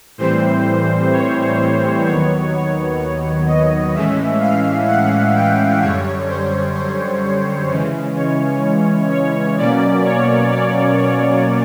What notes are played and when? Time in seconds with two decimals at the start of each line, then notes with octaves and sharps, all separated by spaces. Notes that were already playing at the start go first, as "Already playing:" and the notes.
0.18 A2 E3 G3 C4 C5
1.12 C#5
2.06 D#2 D#3 F#3 B3 C#5
2.52 C#5
3.00 C#5
3.46 D#5
3.94 A2 E3 G#3 C#4 E5
4.40 F5
4.87 F#5
5.35 G5
5.81 F#2 D3 G3 C#5
6.29 C5
6.76 C5
7.69 C#3 E3 G#3 C#4
8.16 C#5
9.11 C#5
9.58 B2 F#3 A#3 C#4 D5
10.05 C#5
10.51 D5
10.99 C#5